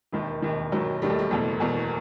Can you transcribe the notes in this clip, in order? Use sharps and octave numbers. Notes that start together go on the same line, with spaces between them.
E1 D#2 D#3
E1 D#2 D#3
E1 D#2 D#3 F#3
E1 D#2 D#3 G3
A3
G3
F#1 E2 B2 A3
F#1 E2 B2